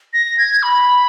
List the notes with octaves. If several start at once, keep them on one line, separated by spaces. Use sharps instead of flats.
A#6
G#6
B5